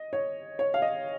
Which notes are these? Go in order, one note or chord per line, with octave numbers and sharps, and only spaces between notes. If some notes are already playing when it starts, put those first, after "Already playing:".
Already playing: D#5
C#5
C#5
F5
D#5